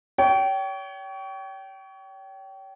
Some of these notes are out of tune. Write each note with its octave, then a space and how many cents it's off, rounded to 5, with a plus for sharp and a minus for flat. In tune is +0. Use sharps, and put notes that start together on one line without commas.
C#5 +30 G5 -25